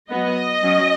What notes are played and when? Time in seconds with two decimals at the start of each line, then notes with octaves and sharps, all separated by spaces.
0.10 F#3 B3 D#5
0.63 F#3 C#4